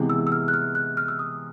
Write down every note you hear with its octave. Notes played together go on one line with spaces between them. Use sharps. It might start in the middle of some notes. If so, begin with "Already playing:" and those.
Already playing: C3 E3 G#3 B3
E6
E6
F6
F#6
F6
F#6
F6
E6
D#6